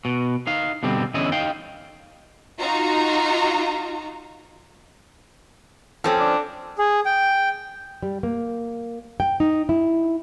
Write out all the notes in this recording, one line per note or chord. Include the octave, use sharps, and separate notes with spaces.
B2
D#4 F5
B2 D3 G3 C4
E2 D3 C#4 E4 D#5
D#4 F5 G5
D#4 F4 F#4 A#5
F3 C4 C#4 A4
D4
G#4
G5
G3
A#3
G5
D#4
E4